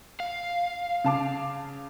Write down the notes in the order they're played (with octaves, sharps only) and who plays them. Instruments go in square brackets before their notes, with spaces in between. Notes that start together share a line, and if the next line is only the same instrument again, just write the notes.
[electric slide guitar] F5
[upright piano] C#3 A5 D6